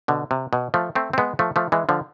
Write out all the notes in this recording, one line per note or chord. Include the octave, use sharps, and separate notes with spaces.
B2 D3
C3
B2
F3 A3
A3 C4
C4
G#3 B3
F3 A3
F3 A3
E3 G#3
D3 F3